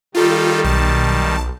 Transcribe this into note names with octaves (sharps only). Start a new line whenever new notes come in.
D#3 G3 F4 A4
B1 A5